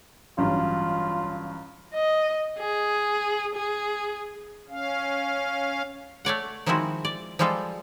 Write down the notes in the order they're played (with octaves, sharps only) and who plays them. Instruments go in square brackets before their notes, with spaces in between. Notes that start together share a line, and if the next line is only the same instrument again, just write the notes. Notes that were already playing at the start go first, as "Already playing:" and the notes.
[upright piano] A1 G2 F#3 [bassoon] F4
[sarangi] D#5
G#4
G#4
[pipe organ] C#4 F5
[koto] A3 C#5 D5 F#5
D#3 F3 G#3 C4 E4 F#4
D5
F3 G3 G#3 F4 A4